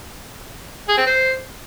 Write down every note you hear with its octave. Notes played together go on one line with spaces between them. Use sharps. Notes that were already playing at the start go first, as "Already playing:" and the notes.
G#4
C4
C5